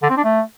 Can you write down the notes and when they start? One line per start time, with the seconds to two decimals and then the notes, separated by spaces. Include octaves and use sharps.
0.03 D3
0.10 C4
0.17 D4
0.24 A3